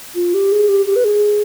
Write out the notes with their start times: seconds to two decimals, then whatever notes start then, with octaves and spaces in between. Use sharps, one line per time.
0.15 F4
0.34 G4
0.52 G#4
0.69 G4
0.87 G4
0.96 B4
1.04 G#4